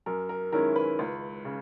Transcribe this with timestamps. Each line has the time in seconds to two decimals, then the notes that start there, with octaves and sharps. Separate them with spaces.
0.06 F#2 A#4
0.29 A#4
0.52 D#3 G#3 C#4 E4 A#4
0.76 B4
0.99 C#2
1.45 C#3